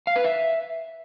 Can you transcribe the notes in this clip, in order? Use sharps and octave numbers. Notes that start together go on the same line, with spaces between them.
F5
B4
E5